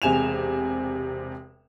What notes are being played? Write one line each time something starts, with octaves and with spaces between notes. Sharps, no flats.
E1 C3 G#3 G#5 E7 F7